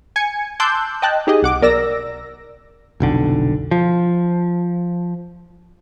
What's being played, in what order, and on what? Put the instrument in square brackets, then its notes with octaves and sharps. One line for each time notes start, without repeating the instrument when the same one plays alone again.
[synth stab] G#5 G#6 C#7
A5 C6 D6 E6 F#6 G6
D#5 G5 A5 F#6
D#4 G4 G#4 D#5
C2 F#5 D6
B1 A#4 D5 E6 A#6
[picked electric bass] F1 B1 D3
F3